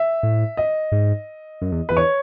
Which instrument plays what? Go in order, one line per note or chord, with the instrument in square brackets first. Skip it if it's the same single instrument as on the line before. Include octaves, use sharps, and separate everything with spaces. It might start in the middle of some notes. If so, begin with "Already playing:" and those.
Already playing: [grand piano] E5
[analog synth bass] A2
[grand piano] D#5
[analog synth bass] G#2
F#2
E2
[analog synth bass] E2 [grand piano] B4
[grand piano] C#5